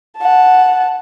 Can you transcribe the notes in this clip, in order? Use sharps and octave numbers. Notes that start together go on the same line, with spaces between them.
F#5 A5